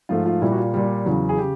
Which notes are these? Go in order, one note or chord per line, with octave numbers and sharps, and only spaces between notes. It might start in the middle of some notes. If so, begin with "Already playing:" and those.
G#2 F3 A3 F4
F4
A#2 G3 E4
F#4
F4
A#2 G3
E2 C#3 F#3
G#4
C#3 G4